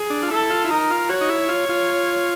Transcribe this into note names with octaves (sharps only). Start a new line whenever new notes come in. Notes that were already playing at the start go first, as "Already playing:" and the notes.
Already playing: G#4
D4
F4
E4 A4
F4
E4
D#4 A#4
F4
F#4 C#5
D#4
E4
F4
F4